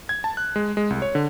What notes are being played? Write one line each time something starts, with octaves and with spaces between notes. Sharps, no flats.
G#6
A5
F#6
G#3
G#3
C2
C#5
D3